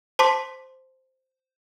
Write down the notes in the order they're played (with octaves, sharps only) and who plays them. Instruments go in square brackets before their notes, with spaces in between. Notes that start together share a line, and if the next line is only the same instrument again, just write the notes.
[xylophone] C5 A5 C6 D6 B6